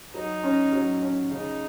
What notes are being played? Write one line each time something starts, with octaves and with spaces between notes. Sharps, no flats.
F#3 D#4
C#4
F#3
C#4
C#3 D#4